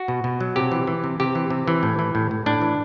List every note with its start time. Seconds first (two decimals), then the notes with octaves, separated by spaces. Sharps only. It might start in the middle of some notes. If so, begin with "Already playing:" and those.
Already playing: F#4
0.08 B2
0.24 B2
0.41 F#3
0.56 C3 G4
0.72 E3
0.87 E3
1.04 C3
1.20 C3 G4
1.35 E3
1.50 C3
1.68 E3
1.83 A2
1.99 E3
2.15 A2
2.31 A2
2.46 A2 D4
2.62 E3